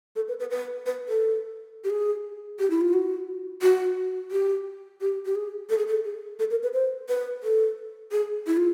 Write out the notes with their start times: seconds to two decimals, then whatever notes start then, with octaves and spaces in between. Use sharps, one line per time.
0.16 A4
0.28 B4
0.40 B4
0.50 B4
0.86 B4
1.09 A4
1.84 G4
1.90 G#4
2.59 G4
2.70 E4
2.81 F4
2.93 F#4
3.62 F#4
4.31 G4
5.01 G4
5.25 G4
5.35 G#4
5.70 A4
5.78 G#4
5.87 A4
6.05 G#4
6.39 A4
6.51 A#4
6.63 B4
6.74 C5
7.09 B4
7.43 A4
8.12 G#4
8.47 E4
8.57 F4